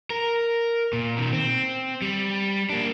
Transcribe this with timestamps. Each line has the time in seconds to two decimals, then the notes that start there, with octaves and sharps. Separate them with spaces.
0.10 A#4
0.93 A#2
1.17 B2 D#3
1.33 C4
2.02 G3
2.70 A#3 D4